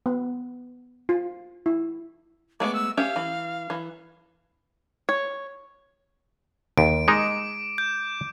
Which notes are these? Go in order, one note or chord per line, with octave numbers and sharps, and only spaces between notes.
B3
F4
E4
G#3 A3 B3 D6
E6
C#4 G4 E5 F5
E3
E3
C#5
D#2 D7
G#3 D#4 D6
G6